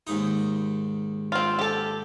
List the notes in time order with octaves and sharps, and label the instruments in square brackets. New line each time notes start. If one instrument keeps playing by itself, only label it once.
[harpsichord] D#2 G#2 D#4
[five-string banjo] C4 F4
G4 A4